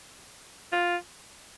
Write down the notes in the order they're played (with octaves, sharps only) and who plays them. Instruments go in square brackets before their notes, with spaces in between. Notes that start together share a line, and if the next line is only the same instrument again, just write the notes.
[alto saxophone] F4